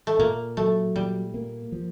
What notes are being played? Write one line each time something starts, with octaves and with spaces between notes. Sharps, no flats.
A3
A#2 A#3
F#3 A3
A#2 G3
A#3
F3